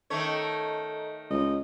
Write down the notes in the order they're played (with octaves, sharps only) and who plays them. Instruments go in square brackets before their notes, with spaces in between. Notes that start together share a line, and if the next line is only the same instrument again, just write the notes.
[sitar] D#3 A3 C#5 [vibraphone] A4 D#5 A#5
[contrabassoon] C#2 [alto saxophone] D#5